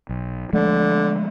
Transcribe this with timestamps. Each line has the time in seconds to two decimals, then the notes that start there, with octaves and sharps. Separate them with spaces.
0.09 B1
0.53 D3 F3 G#3 A3